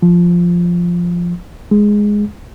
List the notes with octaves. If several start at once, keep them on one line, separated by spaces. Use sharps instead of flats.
F3
G#3